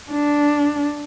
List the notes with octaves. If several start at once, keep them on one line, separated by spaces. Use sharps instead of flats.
D4